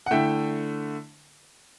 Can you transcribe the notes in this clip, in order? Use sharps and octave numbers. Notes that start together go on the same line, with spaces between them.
F#5
D3 A3 E4 E5 G5